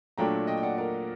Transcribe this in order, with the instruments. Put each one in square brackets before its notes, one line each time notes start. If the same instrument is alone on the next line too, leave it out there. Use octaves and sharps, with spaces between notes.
[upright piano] A#2 F#3 A3 D4 [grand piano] G5 A#5
[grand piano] D#5 G5
G5
D5 F#5
A#4 D5